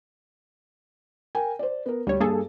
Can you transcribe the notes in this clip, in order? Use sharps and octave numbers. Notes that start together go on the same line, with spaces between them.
A#4 G5 G#5
C5 D5
B3 A#4
D2 G3 C#5
G2 A#3 G#4 A4